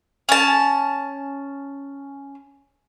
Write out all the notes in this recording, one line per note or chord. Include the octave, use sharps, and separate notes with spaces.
C#4 A5